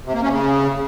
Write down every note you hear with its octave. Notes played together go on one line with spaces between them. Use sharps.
C3
A#3
C#4
C#3